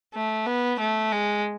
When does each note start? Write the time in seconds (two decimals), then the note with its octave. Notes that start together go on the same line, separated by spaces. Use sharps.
0.14 A3
0.46 B3
0.80 A3
1.12 G#3